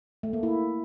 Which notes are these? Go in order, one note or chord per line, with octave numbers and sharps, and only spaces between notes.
A3
A#3
E4